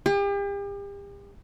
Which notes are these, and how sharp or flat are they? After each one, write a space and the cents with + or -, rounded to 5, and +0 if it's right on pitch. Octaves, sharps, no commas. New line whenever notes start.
G4 +40